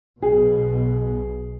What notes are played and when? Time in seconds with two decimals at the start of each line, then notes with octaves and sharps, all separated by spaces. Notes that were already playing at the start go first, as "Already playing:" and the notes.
0.22 B1 B2 G#4